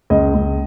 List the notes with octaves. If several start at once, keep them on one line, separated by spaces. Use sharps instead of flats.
C#2 D#5
C#2